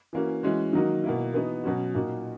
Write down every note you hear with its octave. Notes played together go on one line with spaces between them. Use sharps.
E3 A#3 C#4 F#4
E3 G#3 C#4 F#4
D#3 F#3 A#3 D#4 F#4
B2 A#3 E4
E3 B3 D#4 F#4
B2 F#3 C#4 F#4
A#2 A#3 D#4 F#4